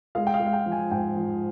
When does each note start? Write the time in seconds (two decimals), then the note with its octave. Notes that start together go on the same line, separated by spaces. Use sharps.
0.15 G#3 F5
0.27 G5
0.34 F5
0.40 G#3
0.47 F5
0.53 G5
0.66 F3
0.72 G#5
0.91 G#2 G5
1.16 F3